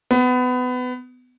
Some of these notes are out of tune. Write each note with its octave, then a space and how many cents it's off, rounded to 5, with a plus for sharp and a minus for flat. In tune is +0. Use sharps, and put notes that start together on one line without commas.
B3 +25